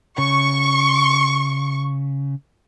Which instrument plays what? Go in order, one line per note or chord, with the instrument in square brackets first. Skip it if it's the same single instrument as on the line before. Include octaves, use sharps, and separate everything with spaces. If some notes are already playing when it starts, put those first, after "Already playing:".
[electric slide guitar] C#3 [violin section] C#6